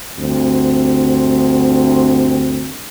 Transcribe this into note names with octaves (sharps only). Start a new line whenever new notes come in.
D2 G2 C4